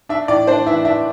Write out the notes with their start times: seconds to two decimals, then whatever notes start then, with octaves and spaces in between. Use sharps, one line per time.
0.09 D4 E5
0.28 A2 D5
0.47 D4 C5
0.67 E3 E5
0.85 D4 E5